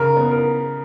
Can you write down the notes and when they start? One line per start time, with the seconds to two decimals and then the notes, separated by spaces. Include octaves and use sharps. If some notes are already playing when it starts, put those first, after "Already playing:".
Already playing: C#3 A#4
0.17 B3
0.31 A#4